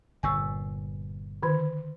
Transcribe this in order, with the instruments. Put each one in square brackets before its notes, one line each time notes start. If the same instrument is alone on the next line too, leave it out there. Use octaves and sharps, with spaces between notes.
[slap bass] G1 A#2 [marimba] G#5 C#6 E6
[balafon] D3 D#3